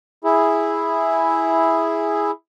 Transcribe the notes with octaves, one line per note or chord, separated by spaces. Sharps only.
E4 G#4